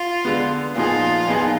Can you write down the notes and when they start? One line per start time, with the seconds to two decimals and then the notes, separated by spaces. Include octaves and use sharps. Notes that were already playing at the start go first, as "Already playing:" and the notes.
Already playing: F4
0.25 D3 G#3 B3
0.76 A#2 F3 B3 D#4 F4 G#4
1.27 A#2 F3 B3 D#4 G#4